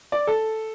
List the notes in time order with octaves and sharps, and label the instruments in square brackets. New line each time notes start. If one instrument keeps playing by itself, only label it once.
[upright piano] D5
A4